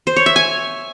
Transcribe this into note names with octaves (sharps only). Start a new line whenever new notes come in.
C5
C#5
E5
G#5